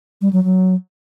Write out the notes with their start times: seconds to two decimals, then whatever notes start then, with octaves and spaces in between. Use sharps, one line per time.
0.21 G3
0.33 F#3
0.44 F#3